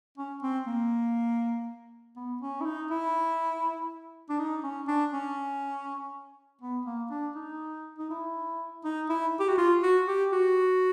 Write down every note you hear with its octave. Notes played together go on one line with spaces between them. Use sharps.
C#4
C4
A#3
B3
C#4
E4
D#4
E4
D4
D#4
C#4
D4
C#4
B3
A#3
D4
D#4
D#4
E4
D#4
E4
G4
F#4
F4
F#4
G4
F#4